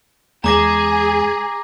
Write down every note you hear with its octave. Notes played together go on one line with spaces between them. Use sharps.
E2 G#3 G#4 A#5 D6 A#6